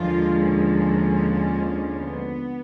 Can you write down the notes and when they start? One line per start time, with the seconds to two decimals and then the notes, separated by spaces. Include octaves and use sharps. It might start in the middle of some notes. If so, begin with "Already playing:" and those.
Already playing: D#2 D3 F3 G#3 F4
0.43 C#4
1.99 B3